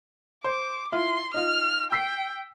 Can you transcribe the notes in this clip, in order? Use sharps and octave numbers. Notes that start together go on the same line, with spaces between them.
C5 D6
E4 F4 C6
D#4 F4 F6
G5 E6 B6 C7